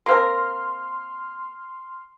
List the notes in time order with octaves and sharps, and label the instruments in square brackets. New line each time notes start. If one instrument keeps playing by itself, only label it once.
[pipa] A#3 C4 A#4 [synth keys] C6 F6